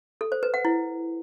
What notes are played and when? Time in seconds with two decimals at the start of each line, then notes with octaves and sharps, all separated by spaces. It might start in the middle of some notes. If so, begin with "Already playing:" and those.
0.21 A4
0.32 C5
0.43 B4
0.54 F#5
0.65 E4